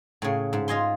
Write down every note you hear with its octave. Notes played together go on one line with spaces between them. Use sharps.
A2 C#3
G#2
F4 D#5 G#5 C6